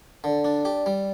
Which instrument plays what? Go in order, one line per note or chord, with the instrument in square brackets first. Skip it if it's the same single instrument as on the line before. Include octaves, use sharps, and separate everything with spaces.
[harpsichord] D3 [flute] D5
[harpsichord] D4
G4
G3